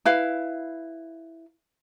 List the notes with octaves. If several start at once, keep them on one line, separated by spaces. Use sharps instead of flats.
E4 B4 F5